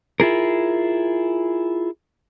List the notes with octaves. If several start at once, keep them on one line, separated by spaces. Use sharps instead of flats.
E4 F4 G#4 A#4